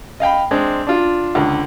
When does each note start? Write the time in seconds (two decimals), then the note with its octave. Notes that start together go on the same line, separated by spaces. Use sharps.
0.20 D#5 F5 G5 B5
0.51 G#3 C4 D4
0.87 D4 F4
1.35 C#2 D3